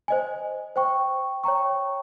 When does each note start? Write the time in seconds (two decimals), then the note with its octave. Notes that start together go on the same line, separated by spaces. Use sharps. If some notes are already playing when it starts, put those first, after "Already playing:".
0.08 C5 D#5 G#5
0.76 C5 G5 C#6
1.44 C#5 G5 A#5 C#6